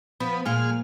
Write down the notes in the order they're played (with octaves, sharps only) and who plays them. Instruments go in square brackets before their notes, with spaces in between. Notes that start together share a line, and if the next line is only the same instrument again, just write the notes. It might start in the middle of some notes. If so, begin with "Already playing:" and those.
[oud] F3 [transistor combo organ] B3
[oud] A#2 F3 F4 [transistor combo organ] G#3 F6